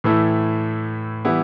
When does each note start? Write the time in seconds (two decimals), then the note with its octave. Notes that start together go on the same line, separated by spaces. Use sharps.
0.04 A2 E3 A3 E4
1.25 E3 G3 B3 E4